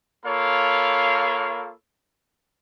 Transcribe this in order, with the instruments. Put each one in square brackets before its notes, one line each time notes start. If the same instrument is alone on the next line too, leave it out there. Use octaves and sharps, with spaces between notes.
[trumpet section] A#3 F4 A4 C#5 F5 B5